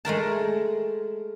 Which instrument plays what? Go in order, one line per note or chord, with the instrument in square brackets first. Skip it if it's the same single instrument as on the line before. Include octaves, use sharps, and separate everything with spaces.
[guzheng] G#3 A3 A#4 A5